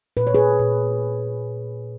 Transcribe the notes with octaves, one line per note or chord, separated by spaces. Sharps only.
A#2 B4
C#5
G#4 B4
A#2